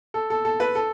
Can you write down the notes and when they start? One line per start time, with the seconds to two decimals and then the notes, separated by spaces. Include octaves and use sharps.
0.14 A4
0.30 A4
0.45 A4
0.60 B4
0.75 A4